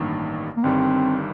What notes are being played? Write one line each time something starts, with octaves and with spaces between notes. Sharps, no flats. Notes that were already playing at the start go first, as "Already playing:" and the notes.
Already playing: A1 G2 D#3 A#3
A#3
G1 G2 D#3 G3 C4